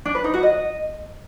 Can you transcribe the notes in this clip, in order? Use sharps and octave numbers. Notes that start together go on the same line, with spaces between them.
D4
B4
D#4
F#4
D#5